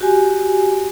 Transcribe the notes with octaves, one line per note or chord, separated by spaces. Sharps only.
F#4 G4 G#5